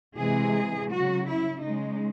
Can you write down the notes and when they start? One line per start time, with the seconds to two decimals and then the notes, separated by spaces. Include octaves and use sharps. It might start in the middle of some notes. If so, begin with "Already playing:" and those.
0.18 C3 E3 G#3 G#4
0.90 C#3 F#3 F#4
1.26 E4
1.62 C#3 G#3 D#4